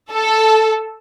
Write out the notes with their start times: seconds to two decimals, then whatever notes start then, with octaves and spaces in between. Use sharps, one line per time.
0.11 A4